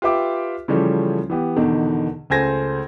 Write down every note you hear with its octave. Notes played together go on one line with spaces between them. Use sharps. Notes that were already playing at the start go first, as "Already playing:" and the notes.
F4 G4 B4 E5 D6
C#3 E3 F3 G3 A3 C#4
E3 B3 G4
E2 B2 D3 D#3
C#2 A3 C5 G#5 G#6 A#6